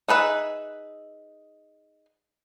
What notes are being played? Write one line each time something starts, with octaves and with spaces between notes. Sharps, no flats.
D#4 G#4 B4 E5